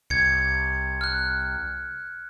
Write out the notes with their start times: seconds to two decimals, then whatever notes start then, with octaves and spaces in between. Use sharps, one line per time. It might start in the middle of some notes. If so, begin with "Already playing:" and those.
0.10 C2 G#6 C#7
1.01 F6 F#6